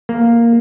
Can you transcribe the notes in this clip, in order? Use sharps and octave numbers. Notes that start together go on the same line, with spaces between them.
A#3